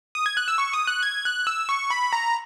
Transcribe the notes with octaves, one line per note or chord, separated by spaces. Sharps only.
D#6
G#6
F#6
E6
C#6
D#6
F#6
G#6
F#6
E6
C#6
B5
A#5